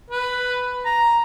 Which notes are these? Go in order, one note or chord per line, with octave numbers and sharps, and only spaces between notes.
B4
A#5